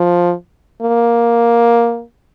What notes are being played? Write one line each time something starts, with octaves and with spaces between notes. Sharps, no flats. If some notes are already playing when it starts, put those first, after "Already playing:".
Already playing: F3
A#3